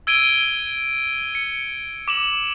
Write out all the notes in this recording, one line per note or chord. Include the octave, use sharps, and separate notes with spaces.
E6 G#6 D7 D#7 G7
C#7
D6 E7 F#7